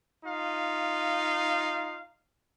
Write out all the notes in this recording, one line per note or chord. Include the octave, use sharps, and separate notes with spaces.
D#4 F4 F5